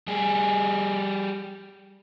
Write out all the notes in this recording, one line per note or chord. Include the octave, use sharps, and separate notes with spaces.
G3 G#4